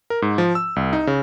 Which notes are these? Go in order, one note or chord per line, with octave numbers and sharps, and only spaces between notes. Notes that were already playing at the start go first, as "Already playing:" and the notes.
A#4
G#2
F3
E6
C2
D#4
C#3